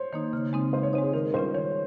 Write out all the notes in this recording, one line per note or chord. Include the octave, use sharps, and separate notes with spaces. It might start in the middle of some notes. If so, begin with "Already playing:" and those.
Already playing: C5 C#5
D#3 A#3 D#4
C#3
G#3 C4 D#4
C#3 C5
C#5
G#3 C4 D#4 C5
G#4
D#3 A#4
G3 C#4 F4 C5
D#3 C#5